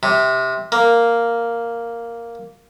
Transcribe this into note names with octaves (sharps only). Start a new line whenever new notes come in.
C3
A#3